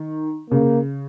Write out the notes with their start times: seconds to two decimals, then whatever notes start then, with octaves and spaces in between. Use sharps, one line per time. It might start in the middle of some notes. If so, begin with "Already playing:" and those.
Already playing: D#3
0.51 C#3 A#3